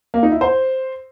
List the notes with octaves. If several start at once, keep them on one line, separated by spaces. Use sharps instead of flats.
A#3
D#4
E4
C5